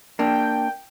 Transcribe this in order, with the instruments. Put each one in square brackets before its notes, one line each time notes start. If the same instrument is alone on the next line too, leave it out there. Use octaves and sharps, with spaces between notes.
[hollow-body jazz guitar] A#3 D4 [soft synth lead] G5